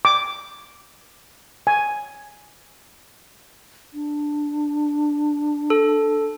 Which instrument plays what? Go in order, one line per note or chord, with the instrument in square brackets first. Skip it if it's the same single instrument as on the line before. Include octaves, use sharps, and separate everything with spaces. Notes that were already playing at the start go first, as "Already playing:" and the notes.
[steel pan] D6
G#5
[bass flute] D4
[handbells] A4